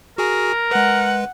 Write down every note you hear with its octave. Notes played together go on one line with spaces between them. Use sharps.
F#4 G#4 A#4 G#5
G#3 B4 F#5